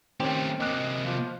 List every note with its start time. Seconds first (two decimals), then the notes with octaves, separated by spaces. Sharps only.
0.20 D#3 A3 C4 C#4 G4
0.61 C3 A#3 D#5 D6 F#6
1.06 F3